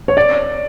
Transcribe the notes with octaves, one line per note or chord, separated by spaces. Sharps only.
C#5
D5